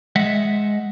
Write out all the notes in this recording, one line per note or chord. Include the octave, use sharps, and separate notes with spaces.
G#3 D#5 E5 F#5